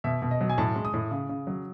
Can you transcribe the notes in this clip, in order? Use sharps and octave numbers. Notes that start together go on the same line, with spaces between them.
B2 E5
B2
D#5
F#3
G#5
A2 A5
G#3
D#6
A2
C#3
C#3
F#3